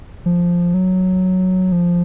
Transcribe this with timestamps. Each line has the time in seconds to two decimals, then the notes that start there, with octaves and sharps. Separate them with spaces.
0.26 F3
0.74 F#3
1.72 F3